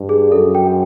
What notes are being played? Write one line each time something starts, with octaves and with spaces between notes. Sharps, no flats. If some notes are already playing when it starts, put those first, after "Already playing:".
Already playing: G2
G#4
F#2 A4
G5